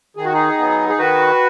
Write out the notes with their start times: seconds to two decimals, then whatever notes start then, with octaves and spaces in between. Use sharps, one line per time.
0.16 D#3 G#4
0.25 F#4
0.33 D#4 G#4
0.58 F#3 B3
0.89 G#4
0.99 D#3 F#4 B4